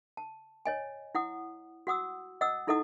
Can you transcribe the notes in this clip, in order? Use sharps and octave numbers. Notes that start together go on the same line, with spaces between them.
A5
C#5 D#5 G#5
E4 F#5 D#6
F#4 F#5 D#6 E6
D#5 F#5 D#6 E6
D#4 E4 A4 D#5 F#5 D#6